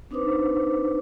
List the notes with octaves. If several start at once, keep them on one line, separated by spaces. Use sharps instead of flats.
C4 D4 D#4 B4 C5 D6